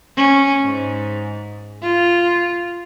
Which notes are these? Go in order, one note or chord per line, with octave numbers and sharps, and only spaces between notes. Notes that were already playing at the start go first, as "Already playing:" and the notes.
C#4
G#2
F4